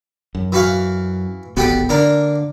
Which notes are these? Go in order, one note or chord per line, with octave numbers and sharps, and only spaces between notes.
F#2
E3 F#4 F5
D1 G#1 B3 F#4 G4 A4
D3 A#3 D4 A#4